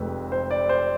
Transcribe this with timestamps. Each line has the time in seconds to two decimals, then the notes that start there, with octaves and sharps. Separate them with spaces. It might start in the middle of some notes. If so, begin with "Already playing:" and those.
Already playing: F1 F2 C3 G#3 B4
0.32 C5
0.51 D5
0.69 C5